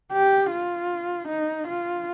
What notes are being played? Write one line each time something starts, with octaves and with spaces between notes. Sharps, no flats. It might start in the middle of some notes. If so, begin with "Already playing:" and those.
G4
F4
D#4
F4